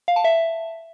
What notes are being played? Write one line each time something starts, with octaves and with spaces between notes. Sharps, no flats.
F5
A5
E5